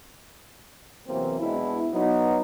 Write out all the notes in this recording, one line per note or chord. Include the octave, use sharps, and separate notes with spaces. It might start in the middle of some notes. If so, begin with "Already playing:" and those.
E2 C3 E3 F#3 A#3 C4
B2 G#3 D4 E4
F#3 B3 D#4